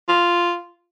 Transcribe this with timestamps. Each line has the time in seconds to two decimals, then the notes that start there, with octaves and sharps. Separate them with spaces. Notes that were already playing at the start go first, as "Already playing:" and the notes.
0.09 F4